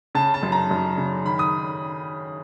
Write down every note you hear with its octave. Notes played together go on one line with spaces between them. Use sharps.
C#3 A5
A5
F#2
A#5
F#2
C#3
D#3 B5
D#6